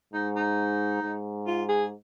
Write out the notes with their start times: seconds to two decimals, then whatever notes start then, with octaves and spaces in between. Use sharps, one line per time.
0.13 G#2 D#4
0.36 D#4
1.02 G#2
1.47 F4
1.69 G#4